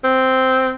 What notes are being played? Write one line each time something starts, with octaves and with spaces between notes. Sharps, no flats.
C4